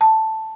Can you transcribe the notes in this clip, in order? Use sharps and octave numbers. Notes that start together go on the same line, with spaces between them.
A5